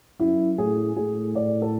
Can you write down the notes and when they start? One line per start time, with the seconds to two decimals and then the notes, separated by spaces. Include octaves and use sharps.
0.20 F#2 E4
0.58 A2 G#4
0.96 A2 G#4
1.35 D5
1.62 A4